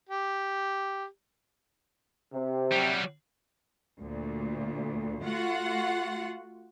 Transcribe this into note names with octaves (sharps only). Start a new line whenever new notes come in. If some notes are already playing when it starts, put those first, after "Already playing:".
G4
C3
F#3 G3
D2 A#2
A3 F4 F#4 F#5